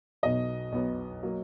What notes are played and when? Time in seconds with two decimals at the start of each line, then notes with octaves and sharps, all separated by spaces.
0.23 B1 B2 F#3 B3 D#5
0.72 B1 B2 F#3 B3
1.23 F#3 A#3